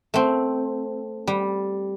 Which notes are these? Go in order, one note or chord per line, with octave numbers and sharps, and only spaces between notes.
A3 C4
G3